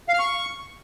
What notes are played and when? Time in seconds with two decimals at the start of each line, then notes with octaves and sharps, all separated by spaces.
0.09 F5
0.14 F6
0.19 C#6